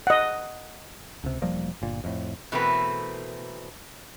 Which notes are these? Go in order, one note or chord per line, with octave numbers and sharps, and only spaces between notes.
D#5 F#5
C#2 C3
E1 F3 G3 A#3
G1 A#2
F2 A2
B2 E3 A3 C4 A#4 B4